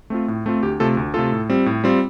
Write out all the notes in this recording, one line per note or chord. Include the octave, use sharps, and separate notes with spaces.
A3 C4 F4
A2
A3 C4 F4
D2 G4
C3 A3 F4 A4
D2
C3 A3 F4 A4
A2
G3 C4 F4
A2
G3 C4 F4